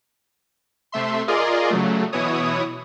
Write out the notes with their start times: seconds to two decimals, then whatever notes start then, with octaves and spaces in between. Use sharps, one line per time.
0.92 C3 A3 E5 C6
1.28 F4 G#4 A#4 D5 D#5 C6
1.70 C#3 F#3 A3
2.12 B2 E3 E4 C#5 D#6